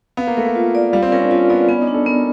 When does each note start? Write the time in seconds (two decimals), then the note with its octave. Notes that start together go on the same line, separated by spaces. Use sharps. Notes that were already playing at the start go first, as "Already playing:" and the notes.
0.17 B3 F5
0.27 A#3
0.37 A3 A#4
0.47 A#3
0.55 F4
0.75 D5
0.93 G3 F5
1.03 C4
1.12 C#4 A#4
1.22 D4
1.31 C#4 F4
1.50 B3 D5
1.69 B3 C#4
1.82 D#4
1.87 D4
1.94 A4
2.06 B3 A#4